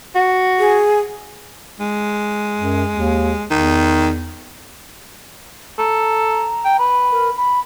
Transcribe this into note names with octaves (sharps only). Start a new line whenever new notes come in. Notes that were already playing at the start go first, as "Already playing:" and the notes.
F#4
G#4
G#3
F#2
D#2
E2 D#3
A4 A#5
G5
B4
A#4
B5